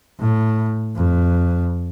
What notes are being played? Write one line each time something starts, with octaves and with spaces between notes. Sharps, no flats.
A2
F2